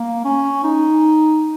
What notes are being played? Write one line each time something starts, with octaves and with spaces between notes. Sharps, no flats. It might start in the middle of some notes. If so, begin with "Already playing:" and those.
Already playing: A#3
C#4
D#4